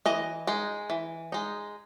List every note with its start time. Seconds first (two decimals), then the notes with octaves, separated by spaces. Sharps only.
0.06 E3 D#5
0.47 G#3 D#4
0.90 E3
1.32 G#3 D#4